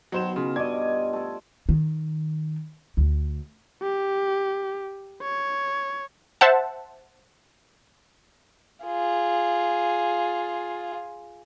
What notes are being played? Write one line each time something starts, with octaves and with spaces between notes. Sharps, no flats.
B2 D#3 F#3 C5 E7
C#3 F4
G2 A4 D5 D#5 G#5 G#6
A3 A4 A5
D#3
D2
G4
C#5
C5 E5 F#5 A5
F4 G#4